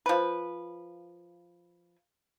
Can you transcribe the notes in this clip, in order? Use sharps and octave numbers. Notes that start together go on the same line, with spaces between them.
F3 B4